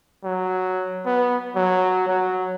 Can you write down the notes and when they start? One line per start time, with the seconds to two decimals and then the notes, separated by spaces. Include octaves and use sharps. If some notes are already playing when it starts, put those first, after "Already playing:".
0.24 F#3
1.06 B3
1.56 F#3
2.08 F#3